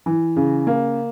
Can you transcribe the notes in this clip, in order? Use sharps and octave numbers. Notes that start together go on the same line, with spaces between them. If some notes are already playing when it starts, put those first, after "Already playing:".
E3
C#3
A#3